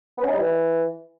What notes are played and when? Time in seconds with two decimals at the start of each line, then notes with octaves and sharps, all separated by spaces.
0.18 B3
0.23 C#4
0.28 D#4
0.33 G3
0.39 E3